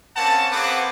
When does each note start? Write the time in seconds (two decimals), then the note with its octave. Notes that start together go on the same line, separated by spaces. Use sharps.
0.16 A#3 C4 C#4 F#5 A5
0.52 A#3 C4 G#4 B4 F#5 D6